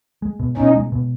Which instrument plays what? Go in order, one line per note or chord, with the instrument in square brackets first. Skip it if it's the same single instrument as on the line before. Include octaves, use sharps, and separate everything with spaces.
[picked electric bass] G#3
B2
[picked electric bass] B2 [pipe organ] C#4 D#4
[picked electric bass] G#3
B2